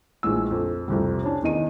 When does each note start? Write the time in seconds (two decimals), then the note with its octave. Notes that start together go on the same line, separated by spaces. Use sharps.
0.23 A#1 E3 G#3 E6
0.51 F2
0.88 C2 F2 C3 G3
1.23 C#4 D4
1.43 E2 D#3 D#5 D#7